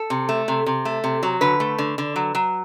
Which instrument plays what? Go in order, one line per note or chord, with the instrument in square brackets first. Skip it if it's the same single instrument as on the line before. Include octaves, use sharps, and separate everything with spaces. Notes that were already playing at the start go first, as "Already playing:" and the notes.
Already playing: [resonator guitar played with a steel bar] A4
C3
A3
C3
C3
A3
C3
F#3
D3 B4
A3
D3
D3
F#3
F#3